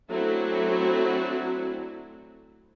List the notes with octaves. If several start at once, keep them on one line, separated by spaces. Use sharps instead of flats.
F#3 A3 C4 D4 E4 F#4